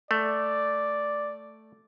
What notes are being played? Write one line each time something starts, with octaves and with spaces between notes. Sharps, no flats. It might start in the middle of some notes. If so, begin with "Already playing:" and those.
A3 D5